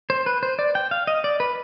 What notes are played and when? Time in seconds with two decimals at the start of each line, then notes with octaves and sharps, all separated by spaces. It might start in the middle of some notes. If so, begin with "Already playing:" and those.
0.10 C5
0.26 B4
0.43 C5
0.59 D5
0.75 G5
0.91 F5
1.07 D#5
1.24 D5
1.40 B4